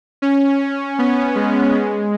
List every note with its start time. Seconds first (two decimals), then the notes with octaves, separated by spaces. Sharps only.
0.22 C#4
0.99 B3
1.35 G#3
1.74 G#3